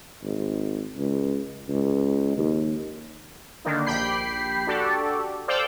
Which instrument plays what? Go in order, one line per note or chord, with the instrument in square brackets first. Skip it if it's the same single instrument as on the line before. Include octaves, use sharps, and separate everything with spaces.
[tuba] G#1
C#2
C#2
D#2
[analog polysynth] D3 D#3 A#3 D4 D#4
A#1 G4 G5 B5 C7
D4 F#4 G4 A4 D5
A4 C5 D5 F5 G5